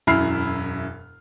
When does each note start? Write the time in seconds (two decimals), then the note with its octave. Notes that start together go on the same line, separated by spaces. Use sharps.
0.07 E1 F#2 E4 B5 F6 C7